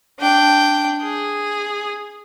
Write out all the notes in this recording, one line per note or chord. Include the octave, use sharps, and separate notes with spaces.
D4 G5
G#4